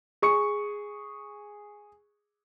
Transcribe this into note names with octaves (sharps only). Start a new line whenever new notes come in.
G#4 C#6 C#7